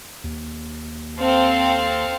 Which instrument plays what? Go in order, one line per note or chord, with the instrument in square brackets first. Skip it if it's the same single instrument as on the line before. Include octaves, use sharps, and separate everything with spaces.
[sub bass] D#2
[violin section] C4 A4 F5